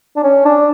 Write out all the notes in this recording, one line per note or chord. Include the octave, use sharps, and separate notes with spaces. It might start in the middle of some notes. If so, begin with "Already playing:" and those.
D4
C#4
D4